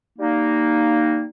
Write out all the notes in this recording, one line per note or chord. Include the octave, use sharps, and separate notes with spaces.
G3 A#3 D#4